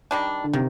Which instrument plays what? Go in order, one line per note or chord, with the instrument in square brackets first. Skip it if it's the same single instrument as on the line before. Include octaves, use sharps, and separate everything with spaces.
[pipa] D#3 G3 D4
[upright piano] D3
[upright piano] C3 [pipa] D#3